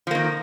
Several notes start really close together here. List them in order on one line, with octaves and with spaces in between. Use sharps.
F3 A#3 D#3